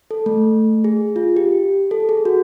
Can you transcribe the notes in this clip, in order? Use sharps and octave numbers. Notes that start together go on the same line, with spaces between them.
A4
A3
G#4
F4
G4
A4
G#4
F#4